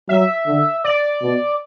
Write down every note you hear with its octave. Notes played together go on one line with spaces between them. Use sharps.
F#3 E5
D3
D5
B2